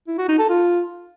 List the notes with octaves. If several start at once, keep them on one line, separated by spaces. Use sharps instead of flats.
E4
F#4
D#4
A4
F4